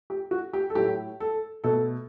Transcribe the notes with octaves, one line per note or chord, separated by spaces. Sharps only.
G4
F#4
G4
A4
A2 F#3 A3 G4
A4
B2 A3 A4